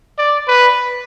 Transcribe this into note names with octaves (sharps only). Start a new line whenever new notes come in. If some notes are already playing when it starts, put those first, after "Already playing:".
D5
B4